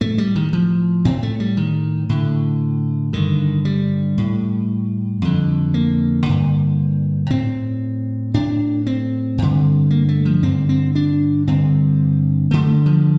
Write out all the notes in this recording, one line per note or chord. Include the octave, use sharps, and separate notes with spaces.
A2 A3
G3
D#3
F3
A2 C4
A3
G3
D#3
A2 D3
G2 D3 D#3
G3
A2
F2 D3
A#3
G2 D3
A2 C4
A2 D4
C4
G2 D3
A#3
A3
F3
G2 D3 C4
C4
D4
G2 D3 C4
G2 D3 A3
F3